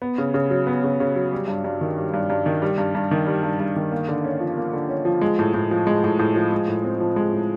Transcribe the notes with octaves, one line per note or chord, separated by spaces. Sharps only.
B3
C#3
C#3
F#3
B3
C#3
C#3
F#3
G3
G2
G2
D#3
G3
G2
G2
D#3
G3
G2
G2
D#3
G3
G2
G2
D#3
A#3
D3
C#4
F3
A#3
D3
C#4
F3
G#3
A2
A2
F3
G#3
A2
A2
F3
G#3
A2
C4
F3
G#3
A2